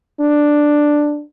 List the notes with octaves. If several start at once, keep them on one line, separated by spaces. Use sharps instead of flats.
D4